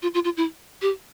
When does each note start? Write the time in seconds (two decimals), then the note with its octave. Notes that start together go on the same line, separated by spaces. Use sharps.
0.02 F4
0.14 F4
0.25 F4
0.37 E4
0.82 G4